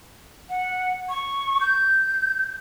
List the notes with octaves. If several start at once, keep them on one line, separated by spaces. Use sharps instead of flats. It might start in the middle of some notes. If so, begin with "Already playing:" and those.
F#5
C#6
G6